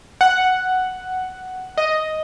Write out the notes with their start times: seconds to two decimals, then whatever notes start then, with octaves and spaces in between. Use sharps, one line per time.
0.21 F#5
1.78 D#5